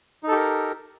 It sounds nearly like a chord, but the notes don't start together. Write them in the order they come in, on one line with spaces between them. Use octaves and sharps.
D#4 A4 G4 A#4